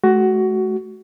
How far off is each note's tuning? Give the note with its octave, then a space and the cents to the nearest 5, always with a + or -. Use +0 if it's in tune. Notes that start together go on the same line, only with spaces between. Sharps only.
A3 -45 F#4 +15